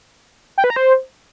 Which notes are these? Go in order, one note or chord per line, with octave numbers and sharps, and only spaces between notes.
G5
B4
A#5
C5